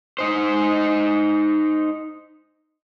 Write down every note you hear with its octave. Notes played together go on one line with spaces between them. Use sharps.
D#4 C5